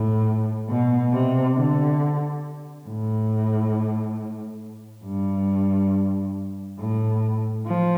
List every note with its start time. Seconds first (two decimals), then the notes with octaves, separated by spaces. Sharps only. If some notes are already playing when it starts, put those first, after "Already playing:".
Already playing: A2
0.69 B2
1.13 C3
1.57 D3
2.88 A2
5.05 G2
6.79 A2
7.67 F3